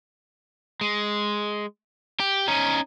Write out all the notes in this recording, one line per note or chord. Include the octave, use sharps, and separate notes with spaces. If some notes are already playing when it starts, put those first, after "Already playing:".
G#3
G4
C#4 D#4